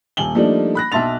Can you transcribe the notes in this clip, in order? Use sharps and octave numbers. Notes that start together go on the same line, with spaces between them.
D#1 G#5 F#7 G7
F3 G3 A3 A#3 D4 D#4
B5 F#6 A#6
B1 E5 A5 C6 A6 F7